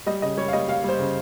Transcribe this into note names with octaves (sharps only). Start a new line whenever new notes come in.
G3 D#5
C#3 D#5
G3 C#5
F5
G3 D#5
G3 F5
G3 C5
C#3